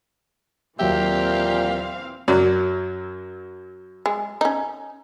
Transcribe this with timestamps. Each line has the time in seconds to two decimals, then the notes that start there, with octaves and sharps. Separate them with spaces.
0.79 D#2 A#2 E3 F#3 C4 G4 E5 F5
2.28 F#2 F#3 D5
4.06 G#3
4.41 C#4 D#4